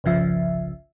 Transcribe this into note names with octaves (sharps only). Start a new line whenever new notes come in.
G1 C2 C#3 F3 E5